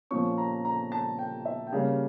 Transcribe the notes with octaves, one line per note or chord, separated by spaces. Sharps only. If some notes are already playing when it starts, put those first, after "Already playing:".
A#2 F3 C#4 C#6
A#5
A#5
A5
G5
E5
G5
C#3 G3 A#3 C#4 F5